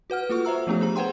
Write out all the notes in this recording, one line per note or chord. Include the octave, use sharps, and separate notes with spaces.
F#4 B4 F#5 F6
A#3 F4 A4 C#6
C5 E5 A#5 E6
F3 A3 B3 D4 G4
D4 G#4 A#5
B4 C5 F#5 G5 C6